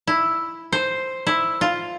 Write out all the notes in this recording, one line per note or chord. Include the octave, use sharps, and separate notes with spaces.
E4
C5
E4
F4